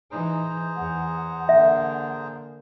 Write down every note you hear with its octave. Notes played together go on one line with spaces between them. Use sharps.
E3 D#4 G#4 C5 A#5
E2 F#5
D3 A#3 E5